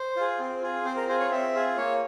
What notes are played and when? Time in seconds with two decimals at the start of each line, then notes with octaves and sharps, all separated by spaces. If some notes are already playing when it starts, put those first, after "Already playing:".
Already playing: C5
0.16 F4 G#4
0.39 C4
0.62 F4 G#4
0.85 C4 C5
0.97 A#4
1.08 F4 G#4 C5
1.20 C#5
1.31 C4 E5
1.54 F4 G#4
1.77 A#3 C#5